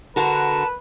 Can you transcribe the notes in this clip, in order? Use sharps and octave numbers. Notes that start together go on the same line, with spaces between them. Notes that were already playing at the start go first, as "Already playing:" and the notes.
D3 F#4 A#4 B4 A5